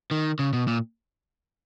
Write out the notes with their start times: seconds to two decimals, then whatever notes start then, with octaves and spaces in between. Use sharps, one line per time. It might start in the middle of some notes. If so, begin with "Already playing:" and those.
0.11 D#3
0.39 C#3
0.53 B2
0.68 A#2